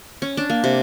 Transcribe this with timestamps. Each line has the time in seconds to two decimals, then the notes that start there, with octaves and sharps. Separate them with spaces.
0.22 C#4
0.37 D4
0.50 A#3
0.64 C3